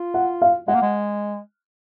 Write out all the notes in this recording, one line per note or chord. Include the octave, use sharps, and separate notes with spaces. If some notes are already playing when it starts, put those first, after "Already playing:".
Already playing: F4
F#5
F5
G#3 F#5
A#3
G#3